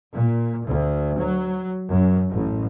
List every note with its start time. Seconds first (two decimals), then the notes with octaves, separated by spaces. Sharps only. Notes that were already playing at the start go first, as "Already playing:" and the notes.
0.12 A#2
0.64 D2
1.16 F#3
1.89 F#2
2.28 A1